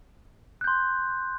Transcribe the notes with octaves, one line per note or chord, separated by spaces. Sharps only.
C6 F#6 G6